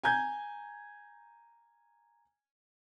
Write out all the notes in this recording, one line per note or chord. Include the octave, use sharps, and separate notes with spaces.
G#5 A#5 G6 G#6